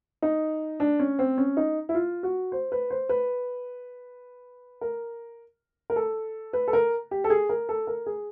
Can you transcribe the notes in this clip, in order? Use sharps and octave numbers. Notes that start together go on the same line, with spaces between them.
D#4
D4
C#4
C4
C#4
D#4
E4
F4
F#4
C5
B4
C5
B4
A#4
A#4
A4
B4
A4
A#4
G4
A4
G#4
A#4
A4
A#4
G#4